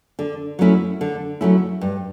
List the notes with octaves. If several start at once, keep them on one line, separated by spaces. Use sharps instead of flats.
D3
F#3 A3 C#4 E4
D3
F#3 A3 C#4 E4
G2